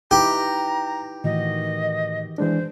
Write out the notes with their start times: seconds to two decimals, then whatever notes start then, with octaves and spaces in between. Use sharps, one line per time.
0.11 D#4 E4 G4 B4 G5 A#5
1.24 A2 D#3 E3 F#4 D#5
2.38 E3 G#3 D4 C5